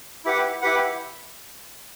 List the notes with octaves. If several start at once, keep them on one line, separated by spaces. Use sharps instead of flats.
E4 G4 B4 F#5
E4 G4 B4 F#5